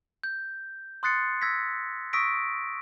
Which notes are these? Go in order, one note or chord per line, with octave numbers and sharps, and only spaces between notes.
G6
C6 D#6 F#6 A6 C7 C#7
E6 G#6 A#6 B6
C#6 D#6 E6 A#6 B6 D7